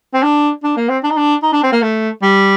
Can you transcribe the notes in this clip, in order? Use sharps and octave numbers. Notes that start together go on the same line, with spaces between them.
C4
D4
D4
A#3
C4
D4
D#4
D4
D#4
D4
C4
A#3
A3
G3